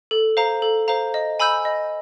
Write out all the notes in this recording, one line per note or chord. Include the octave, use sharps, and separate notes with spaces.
A4
C5 F5 A#5
A4
C5 F5 A#5
D#5
G#5 B5 E6 G6
D#5